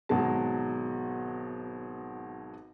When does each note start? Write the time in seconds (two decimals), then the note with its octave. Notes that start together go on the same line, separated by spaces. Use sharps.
0.09 G#1 B2 F#3 G#3 A5